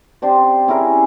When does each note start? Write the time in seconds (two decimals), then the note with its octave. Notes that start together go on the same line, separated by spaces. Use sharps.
0.22 C4 D4 G4 C5
0.68 C#4 E4 G#4 A#4